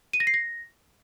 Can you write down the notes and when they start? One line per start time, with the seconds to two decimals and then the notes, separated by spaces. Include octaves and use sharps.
0.13 D#7
0.20 A#6
0.27 C7
0.34 A#6